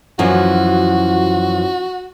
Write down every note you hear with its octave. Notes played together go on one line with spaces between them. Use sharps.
F#2 E3 F3 F#4